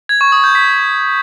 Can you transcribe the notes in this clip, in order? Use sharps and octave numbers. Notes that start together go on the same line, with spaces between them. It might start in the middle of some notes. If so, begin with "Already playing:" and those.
G#6
C#6
D#6
G6
B6